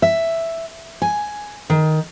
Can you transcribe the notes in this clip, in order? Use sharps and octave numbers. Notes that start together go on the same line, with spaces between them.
E5
G#5
D#3